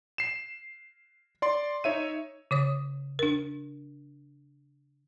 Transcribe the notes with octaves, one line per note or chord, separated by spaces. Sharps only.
C7 E7
D5 C6
D#4 C#5 E5 D#7
C#3 C#5 D#6
D4 A#4